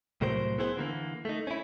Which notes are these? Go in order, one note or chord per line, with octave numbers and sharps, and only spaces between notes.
C2 A2 F#3 A#4 C5
B3 E4 G#4 C5
D3 E3 G#3 A#3
A3 D#4
C#4 E4